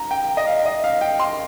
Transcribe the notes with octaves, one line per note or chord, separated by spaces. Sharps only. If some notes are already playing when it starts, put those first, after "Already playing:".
Already playing: A#5
G5
D#5
F5
D#5
F5
G5
C6